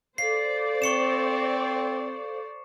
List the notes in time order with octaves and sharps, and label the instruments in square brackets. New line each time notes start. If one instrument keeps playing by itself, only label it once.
[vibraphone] A4 F5 [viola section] C5 D5 [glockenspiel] C7
[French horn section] C4 [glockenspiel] C#6 C#7 E7